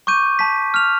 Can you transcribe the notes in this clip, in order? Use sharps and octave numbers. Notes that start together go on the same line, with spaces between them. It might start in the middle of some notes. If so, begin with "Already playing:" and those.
C#6 D6 G6 D#7
A5 B6
F6 F7